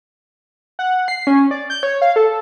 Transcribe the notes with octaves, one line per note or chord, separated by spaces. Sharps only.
F#5
C7
C#4
D5
G6
C#5
F5
A4